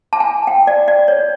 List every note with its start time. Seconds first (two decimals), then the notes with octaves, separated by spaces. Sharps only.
0.13 A5
0.20 G#5
0.47 G5
0.67 D5
0.88 D5
1.08 C#5